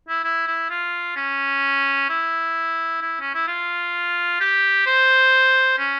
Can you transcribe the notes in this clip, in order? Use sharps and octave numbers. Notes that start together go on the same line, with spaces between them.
E4
E4
E4
F4
C#4
E4
E4
C#4
E4
F4
G4
C5
C#4